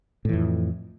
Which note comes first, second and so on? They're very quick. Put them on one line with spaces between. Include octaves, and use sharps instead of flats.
A2 E3 F2